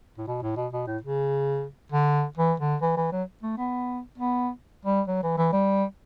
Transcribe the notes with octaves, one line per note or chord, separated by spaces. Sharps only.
A2
B2
A2
B2
B2
A2
C#3
D3
E3
D3
E3
E3
F#3
A3
B3
B3
G3
F#3
E3
E3
G3